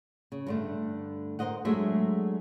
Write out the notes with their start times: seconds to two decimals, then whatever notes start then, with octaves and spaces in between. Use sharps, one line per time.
0.32 C#3
0.46 G2 D3 A3
1.39 A#4 C5 C#5 D#5 F#5
1.65 F#3 G#3 A3 D4 G#4 E5